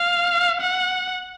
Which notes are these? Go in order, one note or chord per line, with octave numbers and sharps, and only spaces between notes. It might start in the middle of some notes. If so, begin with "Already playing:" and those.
Already playing: F5
F#5